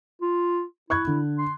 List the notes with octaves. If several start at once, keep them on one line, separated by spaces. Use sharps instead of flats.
F4
E4 C#6 F#6 G#6
D3
C6